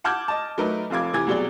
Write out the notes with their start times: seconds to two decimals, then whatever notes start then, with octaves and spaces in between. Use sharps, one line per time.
0.04 F#5 A5 D6 F6 G6 G#6
0.28 D#5 A5
0.58 F#3 A3 D#4 A#4 B4
0.90 F1 F2 F5 D6 G#6
1.13 C3 E3 G#5 G#6
1.27 C2 B2 F#3 G#4 D5 G7